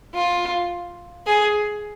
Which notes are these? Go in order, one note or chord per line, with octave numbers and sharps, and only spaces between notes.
F4
G#4